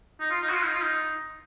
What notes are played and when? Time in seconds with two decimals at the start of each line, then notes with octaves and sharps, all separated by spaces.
0.20 D#4
0.31 F4
0.42 D#4
0.49 F#4
0.53 F4
0.65 D#4
0.73 F4
0.82 D#4